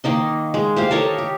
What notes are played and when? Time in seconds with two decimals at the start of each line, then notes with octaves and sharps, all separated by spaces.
0.04 D#3 A#3 D#4 C6
0.54 G#3
0.76 G4 C5 F5
0.91 A4 A#4 C#5 D#5
1.18 G4